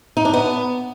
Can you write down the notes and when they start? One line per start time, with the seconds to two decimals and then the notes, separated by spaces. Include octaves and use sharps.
0.17 D#4
0.25 D4
0.33 B3